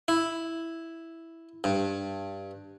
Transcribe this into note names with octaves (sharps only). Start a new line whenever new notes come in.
E4
G2